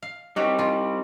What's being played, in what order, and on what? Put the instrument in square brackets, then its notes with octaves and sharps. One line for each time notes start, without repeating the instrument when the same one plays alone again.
[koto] F5
[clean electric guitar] G3 C4 [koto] D#4 F#4 C#5
[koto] D#4 F4